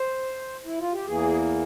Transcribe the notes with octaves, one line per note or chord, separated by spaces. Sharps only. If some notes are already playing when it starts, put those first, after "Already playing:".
Already playing: C5
E4
F4
G4
E2 E3 A#3 G#4